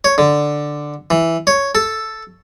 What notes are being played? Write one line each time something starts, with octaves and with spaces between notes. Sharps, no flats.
C#5
D3
E3
C#5
A4